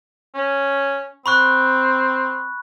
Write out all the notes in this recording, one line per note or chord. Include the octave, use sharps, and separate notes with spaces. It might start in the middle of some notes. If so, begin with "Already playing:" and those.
C#4
C4 B5 C#6 F#6